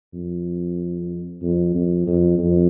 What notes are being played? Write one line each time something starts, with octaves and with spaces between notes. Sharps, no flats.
F2
F2
F2
F2
F2